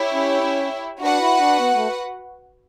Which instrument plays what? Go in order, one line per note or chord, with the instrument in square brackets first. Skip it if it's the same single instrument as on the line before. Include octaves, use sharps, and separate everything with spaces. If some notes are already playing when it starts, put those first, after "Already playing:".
Already playing: [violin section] E4 G4 C#5 E5
[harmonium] C#4
C#4
[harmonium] D4 [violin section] F#4 B4 F#5
[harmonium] E4
D4
B3
A3